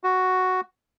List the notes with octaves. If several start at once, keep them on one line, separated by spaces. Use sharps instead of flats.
F#4